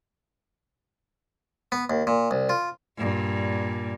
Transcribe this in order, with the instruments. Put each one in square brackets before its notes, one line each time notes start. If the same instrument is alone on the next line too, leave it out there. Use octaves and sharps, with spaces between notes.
[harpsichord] B3
D#2
A#2
C2
F4
[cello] G2 A#2